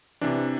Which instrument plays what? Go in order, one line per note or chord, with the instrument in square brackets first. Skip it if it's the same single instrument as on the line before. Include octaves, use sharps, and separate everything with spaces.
[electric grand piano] C3 E3 D4